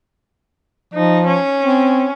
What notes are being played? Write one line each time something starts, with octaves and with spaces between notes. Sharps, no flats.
F3 D#4
C#4
C4